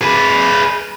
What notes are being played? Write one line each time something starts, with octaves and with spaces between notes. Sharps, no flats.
G#4 B4